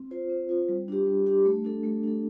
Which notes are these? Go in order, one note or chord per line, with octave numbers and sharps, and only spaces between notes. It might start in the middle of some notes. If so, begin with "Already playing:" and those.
Already playing: C4
F4 C5
C4
F4 C5
G3
D4 G4
G3
D4 G4
A3
D4 A4
A3
D4 A4